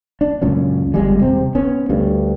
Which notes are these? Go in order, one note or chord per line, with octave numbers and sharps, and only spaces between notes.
D4
C#2 F#2 A#2 C#4
G1 F2 G3 G#3
D#1 C3 C4
B3 C#4
D2 G2